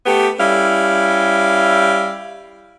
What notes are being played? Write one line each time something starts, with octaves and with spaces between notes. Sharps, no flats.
A3 B3 G4
G3 C#4 E4 F5